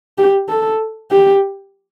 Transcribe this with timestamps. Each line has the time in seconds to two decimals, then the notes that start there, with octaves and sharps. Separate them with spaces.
0.18 G4
0.49 A4
1.11 G4